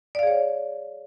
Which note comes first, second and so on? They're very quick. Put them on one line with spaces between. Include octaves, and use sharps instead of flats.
D5 F5 G#4 C#5